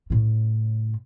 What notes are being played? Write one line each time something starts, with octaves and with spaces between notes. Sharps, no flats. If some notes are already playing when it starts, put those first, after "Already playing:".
A2 C#3